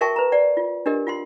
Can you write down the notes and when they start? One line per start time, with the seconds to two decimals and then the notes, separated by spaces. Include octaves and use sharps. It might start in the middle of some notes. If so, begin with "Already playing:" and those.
0.01 F#4 A#4 E5 G5 A5 C#6
0.16 B4 A#5
0.32 D5 F#5
0.57 F4
0.86 D4 G4 A#4 D#5
1.07 F4 F#5 C6